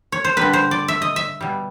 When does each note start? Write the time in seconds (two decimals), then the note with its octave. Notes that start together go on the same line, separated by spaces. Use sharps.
0.12 C#5
0.25 C5
0.37 D3 G3 B4
0.53 C5
0.71 D5
0.88 E5
1.02 D#5
1.16 E5
1.41 B2 G3